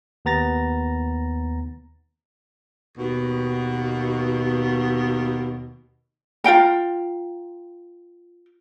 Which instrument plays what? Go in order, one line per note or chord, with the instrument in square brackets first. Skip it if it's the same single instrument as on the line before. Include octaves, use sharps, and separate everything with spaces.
[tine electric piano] D#2 B3 A#5 A6 A#6
[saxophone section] D#2 B2
[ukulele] F4 F5 G5 A#5